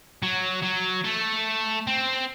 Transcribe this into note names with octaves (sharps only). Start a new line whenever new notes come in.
F#3
F#3
A3
C4